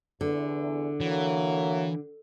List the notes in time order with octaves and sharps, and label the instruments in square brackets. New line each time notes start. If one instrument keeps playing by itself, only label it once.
[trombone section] E2 [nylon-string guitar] D3
[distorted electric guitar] E3 [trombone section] F#3 A3 A#3